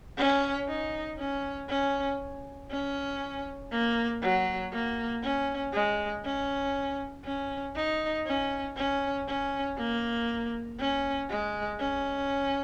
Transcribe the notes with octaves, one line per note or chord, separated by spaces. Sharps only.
C#4
D#4
C#4
C#4
C#4
A#3
F#3
A#3
C#4
G#3
C#4
C#4
D#4
C#4
C#4
C#4
A#3
C#4
G#3
C#4